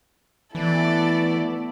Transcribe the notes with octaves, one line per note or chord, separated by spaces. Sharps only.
E3 A3 B3 E4 A4 D5